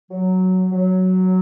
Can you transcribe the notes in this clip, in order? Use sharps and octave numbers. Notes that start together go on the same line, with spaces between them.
F#3
F#3